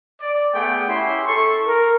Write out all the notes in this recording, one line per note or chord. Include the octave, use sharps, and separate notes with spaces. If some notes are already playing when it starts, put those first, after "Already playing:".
D5
A3 B3 G#4 F#5 G5
C#4 E4 G4 E5 C6
A4 C#6
A#4